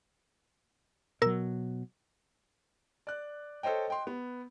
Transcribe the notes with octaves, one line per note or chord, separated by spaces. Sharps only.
B2 F#3 A#4 E6
D5 F#6
A4 C5 C#5 D#5 G5
D#5 G5 C6
B3